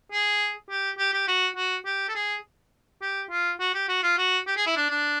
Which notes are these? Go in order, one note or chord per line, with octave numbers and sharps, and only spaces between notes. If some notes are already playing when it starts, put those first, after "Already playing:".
G#4
G4
G4
G4
F#4
F#4
G4
A4
G#4
G4
F4
F#4
G4
F#4
F4
F#4
G4
G#4
E4
D4
D4